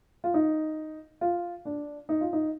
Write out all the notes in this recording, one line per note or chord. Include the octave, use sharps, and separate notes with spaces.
F4
D#4
F4
D4
D#4
F4
D#4